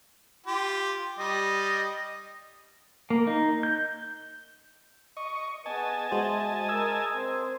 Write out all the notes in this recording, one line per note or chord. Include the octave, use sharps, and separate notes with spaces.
F4 G4
G3 D#5
A#3
D#4
G6
D#5 C#6
B3 G#4 D#5 G#5 A5
G#3 F#4 C5 E5
G#3 A#4 D#6 E6 G#6
C4 C5